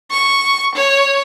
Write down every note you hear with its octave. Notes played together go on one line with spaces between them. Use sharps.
C#6
C#5